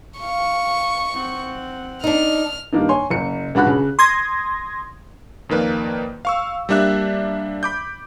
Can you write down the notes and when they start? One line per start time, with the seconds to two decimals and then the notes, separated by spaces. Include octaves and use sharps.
0.20 F5 C#6
1.13 C4 F#5
2.04 D4 D#4 F6
2.72 G2 D#3 A#3 D4 D#4
2.89 C#5 G#5 C6
3.10 F#1 C#7
3.55 C#2 D4 F#4 B5 F#6
3.67 C#3
3.99 C6 D#6 G#6 A#6
5.49 F2 D#3 A#3 B4 D5
6.25 F5 C#6 E6
6.69 G3 A#3 D4 E5 F#6
7.63 B5 D6 G6